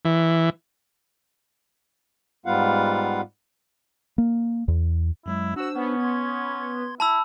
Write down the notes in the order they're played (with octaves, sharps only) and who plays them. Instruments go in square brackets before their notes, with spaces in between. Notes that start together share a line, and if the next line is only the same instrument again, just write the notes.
[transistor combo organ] E3
[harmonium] G#2 G3 B3 F4 F5 F#5
[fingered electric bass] A#3
E2
[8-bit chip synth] F#2 F#3 G#3 [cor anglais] E4
[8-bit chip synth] D4 C5 [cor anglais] F#4 [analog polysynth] E6
[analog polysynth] B3 [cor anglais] C#4
[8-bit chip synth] C6 G#6
[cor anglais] E4 [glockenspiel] A5 B5 E6